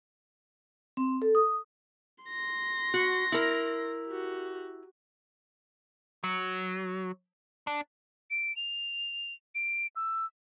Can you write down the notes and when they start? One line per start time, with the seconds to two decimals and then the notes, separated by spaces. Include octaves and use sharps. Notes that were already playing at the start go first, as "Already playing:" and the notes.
0.97 C4
1.22 A4
1.35 D#6
2.24 C6 A#6
2.94 F#4
3.32 E4 A#4
4.07 F#4 G4
6.24 F#3
7.67 D4
8.31 D7
8.56 F7
9.55 D7
9.96 E6